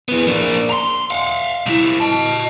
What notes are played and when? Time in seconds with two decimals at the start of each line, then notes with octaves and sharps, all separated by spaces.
0.09 E3 B3
0.27 A#3 D4
0.70 A#5 C6
1.10 F5 F#5
1.66 C2 E4
2.00 D#5 A5